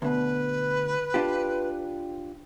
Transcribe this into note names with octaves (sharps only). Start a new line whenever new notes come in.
D2 B2 B4
D4 F4 G4